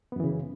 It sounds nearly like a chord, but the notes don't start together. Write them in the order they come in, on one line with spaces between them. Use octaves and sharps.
B3 F#2 E3 C#3